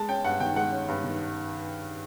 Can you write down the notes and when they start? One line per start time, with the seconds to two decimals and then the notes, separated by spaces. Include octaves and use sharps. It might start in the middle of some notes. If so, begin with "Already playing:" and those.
Already playing: G#3 A5
0.09 C#4 G5
0.24 G2 F#5
0.40 D#3 G5
0.56 G#3 F#5
0.72 C#4
0.88 G2
1.04 D#3